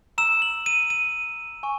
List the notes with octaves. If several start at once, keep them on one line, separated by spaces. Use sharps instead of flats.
A#5 E6 E7
F#7
D#7
D#7
G#5 C#6